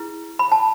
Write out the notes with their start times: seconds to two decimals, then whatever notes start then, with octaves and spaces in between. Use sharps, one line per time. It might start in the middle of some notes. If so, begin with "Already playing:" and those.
Already playing: E4 G#4 B4
0.39 B5
0.52 A5